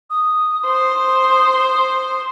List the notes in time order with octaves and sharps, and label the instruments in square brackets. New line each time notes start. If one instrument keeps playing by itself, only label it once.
[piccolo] D#6
[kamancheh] C5 [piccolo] D#6